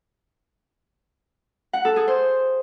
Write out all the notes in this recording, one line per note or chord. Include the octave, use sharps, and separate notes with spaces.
F#5
A4
G#4
C5